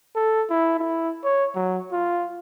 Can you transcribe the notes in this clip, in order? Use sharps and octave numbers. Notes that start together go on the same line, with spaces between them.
A4
E4
E4
C#5
F#3
F4